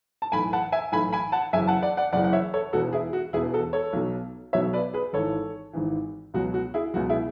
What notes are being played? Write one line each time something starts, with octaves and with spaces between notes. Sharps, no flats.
A5
B1 A2 E3 G#5 B5
F#5 A5
E5 G#5
B1 A2 E3 G#5 B5
G#5 B5
F#5 A5
F#1 F#2 C#3 E3 E5 G#5
F#5 A5
D5 F#5
D5 F#5
F#1 F#2 C#3 E3 D5 F#5
F#5
C#5 E5
A4 C#5
E1 E2 B2 F#4 A4
E4 G#4
F#4
E1 E2 B2 E4 G#4
F#4 A4
A4 C#5
B1 B2 F#3
B1 B2 F#3 C#5 E5
B4 D5
G#4 B4
G#1 G#2 E3 A4 C#5
G#1 G#2 E3
C#2 B2 F#3 F#4
F#4
E4 G#4
C#2 B2 F#3 F#4
E4 G#4